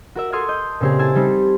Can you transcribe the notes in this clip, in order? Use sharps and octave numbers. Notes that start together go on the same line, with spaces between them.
F#4 A#4 E5
A4 E5 C6 D#6 F6 G#6
D#5 G6
A#2 C#3 C4 G4 G#4
E4 G#5 A5 E6
G3 C4 D#4